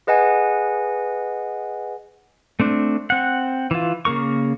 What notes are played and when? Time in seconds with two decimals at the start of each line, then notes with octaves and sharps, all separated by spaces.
0.07 G#4 B4 D#5 F#5 G#5
2.60 A3 C4 D4
3.10 C4 F#5
3.71 E3 F4
4.05 C#3 A#3 A#4 C#6